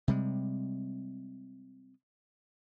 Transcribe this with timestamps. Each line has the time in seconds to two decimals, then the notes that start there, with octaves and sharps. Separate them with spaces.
0.08 C3 G3 G#3